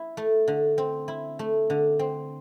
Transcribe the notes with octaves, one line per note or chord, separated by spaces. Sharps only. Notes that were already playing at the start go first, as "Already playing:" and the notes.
Already playing: E4
A3
D3
C4
E4
A3
D3
C4